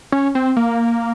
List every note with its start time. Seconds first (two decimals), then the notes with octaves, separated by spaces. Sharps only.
0.12 C#4
0.35 C4
0.57 A#3